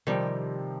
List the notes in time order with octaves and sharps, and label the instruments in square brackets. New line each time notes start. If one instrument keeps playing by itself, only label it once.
[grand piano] C3 F3 C4 [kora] D#3 G3